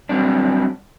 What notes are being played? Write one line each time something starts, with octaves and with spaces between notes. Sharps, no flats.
F#3 G3 C4 D4